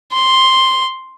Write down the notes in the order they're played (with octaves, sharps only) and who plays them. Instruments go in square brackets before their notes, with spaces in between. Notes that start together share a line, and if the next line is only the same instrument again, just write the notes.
[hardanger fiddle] C6